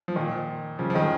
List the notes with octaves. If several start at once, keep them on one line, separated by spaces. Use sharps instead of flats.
F3
A#2 D#3
C#3 F3
F3
D#3 G#3